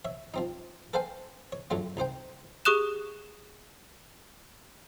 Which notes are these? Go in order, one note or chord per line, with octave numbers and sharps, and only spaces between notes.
C#5 E5
F3 C4 D#4
A4 B4 C5 F5 G5 G#5
C#5
F#2 D3 F#3 A3 F4
C2 D#4 C5 G5
G4 G#4 C#6 D#6 F#6 E7